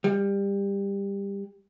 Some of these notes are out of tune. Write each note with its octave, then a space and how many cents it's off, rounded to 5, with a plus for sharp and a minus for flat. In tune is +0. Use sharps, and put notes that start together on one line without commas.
G3 +20